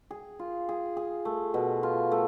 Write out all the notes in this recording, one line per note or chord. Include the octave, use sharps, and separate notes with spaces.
G#4
F4
G#4
G#4
A3
B2
F4
A3